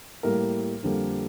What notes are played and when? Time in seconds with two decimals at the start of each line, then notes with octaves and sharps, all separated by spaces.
0.23 A2 G3 A#3 A#4
0.83 F2 D3 G3 A#3